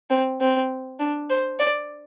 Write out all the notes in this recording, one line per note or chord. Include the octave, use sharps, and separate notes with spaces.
C4
C4
D4
C5
D5